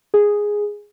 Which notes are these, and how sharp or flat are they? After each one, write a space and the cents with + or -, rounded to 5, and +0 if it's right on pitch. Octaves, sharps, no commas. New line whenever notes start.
G#4 -5